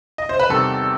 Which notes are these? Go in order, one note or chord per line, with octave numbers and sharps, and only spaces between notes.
D#5
C5
B4
E2 C3 D#3 G3 A4